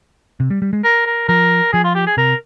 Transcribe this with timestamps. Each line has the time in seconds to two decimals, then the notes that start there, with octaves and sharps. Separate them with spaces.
0.40 C3
0.50 G3
0.62 G3
0.73 G#3
0.84 A#4
1.06 A#4
1.28 F3 A#4
1.72 F3 G#4
1.84 F4
1.95 G4
2.06 G#4
2.17 C3 A#4